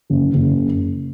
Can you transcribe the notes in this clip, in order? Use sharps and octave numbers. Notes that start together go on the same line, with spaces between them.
F#1
F#1